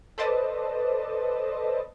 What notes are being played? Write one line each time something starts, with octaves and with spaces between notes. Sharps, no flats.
A4 B4 C5 D5 D#5 A5